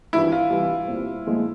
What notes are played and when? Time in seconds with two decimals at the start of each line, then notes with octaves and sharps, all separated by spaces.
0.13 G#1 G2 E3 E4
0.32 F4
0.50 C2 C3 E3 G3
0.88 A#2 G3 C4 F4
1.26 A#1 A#2 F3 G#3 E4